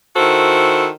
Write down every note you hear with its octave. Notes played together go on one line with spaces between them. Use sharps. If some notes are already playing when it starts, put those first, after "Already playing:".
D#3 E4 F#4 A4 C5